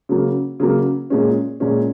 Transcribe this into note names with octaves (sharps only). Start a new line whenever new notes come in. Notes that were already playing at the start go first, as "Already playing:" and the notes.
C#3 F#3 A#3
C#3 F#3 A#3
A#2 G#3 C#4
A#2 G#3 C#4